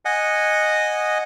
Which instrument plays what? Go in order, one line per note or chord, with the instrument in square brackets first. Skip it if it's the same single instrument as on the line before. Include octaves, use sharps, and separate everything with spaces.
[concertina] D#5 F#5 G#5